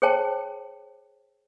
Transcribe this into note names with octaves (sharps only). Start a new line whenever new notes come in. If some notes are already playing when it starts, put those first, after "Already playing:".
G#4 C5 C#5 G5 A5